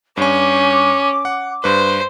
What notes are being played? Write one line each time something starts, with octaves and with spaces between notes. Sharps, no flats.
G2 C#4 C#6 D6
F#5
G2 B4 C5